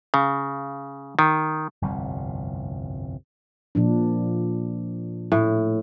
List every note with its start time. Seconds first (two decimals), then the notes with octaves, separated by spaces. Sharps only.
0.14 C#3
1.19 D#3
1.82 G1 C2 F2 G3
3.75 A#2 F3 D4
5.32 A2